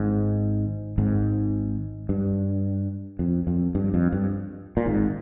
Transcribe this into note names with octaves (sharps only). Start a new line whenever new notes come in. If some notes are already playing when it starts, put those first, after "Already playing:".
Already playing: G#1 G#2
G#1 G#2
G2
F2
F2
G2
F2
G2
A#2
G#1 G#2